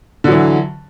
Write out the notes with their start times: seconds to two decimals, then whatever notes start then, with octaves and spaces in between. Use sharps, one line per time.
0.24 D3
0.28 F#3
0.32 E3